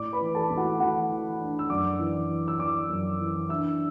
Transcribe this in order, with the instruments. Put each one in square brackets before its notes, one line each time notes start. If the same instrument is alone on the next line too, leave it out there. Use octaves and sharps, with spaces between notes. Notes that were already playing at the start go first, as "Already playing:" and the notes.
Already playing: [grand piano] A2 D5 D6
B4 B5
E3
A4 A5
A2
F#4 F#5
E3 F#4 F#5
E3
D4
E6
F#2 D5 D6
E3
E3
E6
E3 D5 D6
F#2
E3
D4 E5 E6